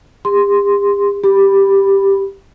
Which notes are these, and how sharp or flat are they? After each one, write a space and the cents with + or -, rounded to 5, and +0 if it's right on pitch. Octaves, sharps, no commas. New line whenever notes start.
G4 +45 C6 +0
G4 +0 B5 +0